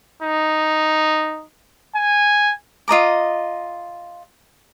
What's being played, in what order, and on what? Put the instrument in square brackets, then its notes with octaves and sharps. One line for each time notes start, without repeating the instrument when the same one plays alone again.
[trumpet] D#4
G#5
[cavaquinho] F4 D#5 A#5 D6